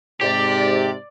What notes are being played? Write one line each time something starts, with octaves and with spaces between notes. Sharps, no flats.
G#2 C3 G4 D5